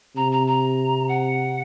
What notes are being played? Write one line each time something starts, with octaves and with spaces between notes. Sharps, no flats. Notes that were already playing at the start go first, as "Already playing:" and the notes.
C3 A#5
A#5
A#5
F#5